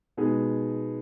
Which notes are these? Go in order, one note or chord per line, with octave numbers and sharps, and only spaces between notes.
B2 G#3 B3 D#4 G#4